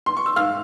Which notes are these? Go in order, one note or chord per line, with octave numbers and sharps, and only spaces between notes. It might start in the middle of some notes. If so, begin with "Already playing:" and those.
C6
C#6
E6
G#2 F5 F6